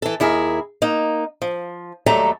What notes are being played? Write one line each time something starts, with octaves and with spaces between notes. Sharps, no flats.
E3 A4
D#2 E4 G#4 A#4
A#3 D#4
F3
D#2 F#3 G3 A3 A4 A#5